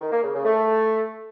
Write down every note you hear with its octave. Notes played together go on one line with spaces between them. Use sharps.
D#3
A#3
C#3
C#3
A3